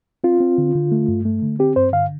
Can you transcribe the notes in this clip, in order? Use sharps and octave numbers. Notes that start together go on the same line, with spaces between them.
C4 F4
C4
D3
D3
A3
G2
A3
D3
C4 G4
G2 C5
D3 F5